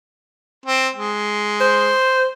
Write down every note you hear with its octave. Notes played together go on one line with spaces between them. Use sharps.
C4
G#3
C5